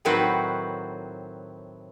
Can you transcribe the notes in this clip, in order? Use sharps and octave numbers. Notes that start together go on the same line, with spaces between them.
A2 D#3 F#3 C4 F#4 B4